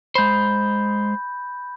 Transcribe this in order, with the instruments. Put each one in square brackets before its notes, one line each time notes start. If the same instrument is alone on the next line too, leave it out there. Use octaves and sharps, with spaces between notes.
[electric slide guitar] G#3 C5 [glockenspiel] B5 G6